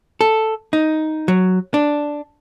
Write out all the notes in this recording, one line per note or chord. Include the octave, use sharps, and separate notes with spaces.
A4
D#4
F#3
D4